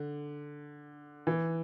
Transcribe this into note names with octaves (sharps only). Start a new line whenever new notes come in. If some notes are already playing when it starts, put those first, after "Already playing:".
Already playing: D3
E3